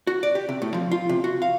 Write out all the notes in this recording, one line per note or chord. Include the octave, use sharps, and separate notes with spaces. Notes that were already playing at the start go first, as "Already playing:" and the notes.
F#4
D5
G4
C3
A2
F3
F4
C3
F#4
F5